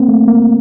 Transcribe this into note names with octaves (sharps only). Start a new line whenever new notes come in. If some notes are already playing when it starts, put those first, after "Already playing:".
Already playing: A#3 C4
A3
A#3